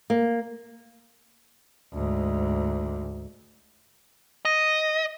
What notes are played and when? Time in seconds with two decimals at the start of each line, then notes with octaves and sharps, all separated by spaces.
0.10 A#3
1.93 D2 G#2
4.45 D#5